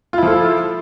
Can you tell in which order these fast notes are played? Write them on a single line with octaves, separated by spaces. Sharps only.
F4 E4 F3 A4